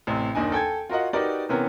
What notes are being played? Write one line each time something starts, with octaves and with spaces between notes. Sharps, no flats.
A1 C3
F#1 D#2 D4 D#4 G#5
A4 G5 G#5 G#6
F4 F#4 A#4 D#5 F#5
D#4 F#4 G4 A#4 B4 D5
C3 E3 B3 C#4 A#4